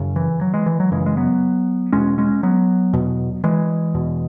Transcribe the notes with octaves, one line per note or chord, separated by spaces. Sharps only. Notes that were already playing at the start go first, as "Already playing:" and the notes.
Already playing: F#2 C#3
E3
F#3
E3 G#3
E3
F#3
F#2 C#3 E3 G#3
G#3
F#3 B3
E2 B2 G#3 C#4
G#3 C#4
F#3 B3
E2 B2
E3 G#3
E2 B2